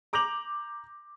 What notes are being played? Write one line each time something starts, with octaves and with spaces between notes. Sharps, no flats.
A#5 D6 G6 A#6 F7 F#7